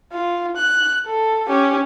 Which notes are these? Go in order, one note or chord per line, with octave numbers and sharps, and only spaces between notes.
F4
F#6
A4
C#4 G4